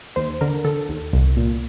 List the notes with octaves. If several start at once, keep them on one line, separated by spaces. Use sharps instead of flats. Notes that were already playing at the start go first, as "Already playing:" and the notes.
D#2 C5
D3 A#4
D3 A4
D#2
C2
A#2